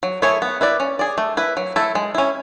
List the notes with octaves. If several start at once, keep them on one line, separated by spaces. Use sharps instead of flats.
F#3
A3 E4 G#4 C#5
B3
E4 B4 D5
C#4
G#4 D5
A3
E4 B4
F#3
A3 E4 A4
G#3
C#4 E4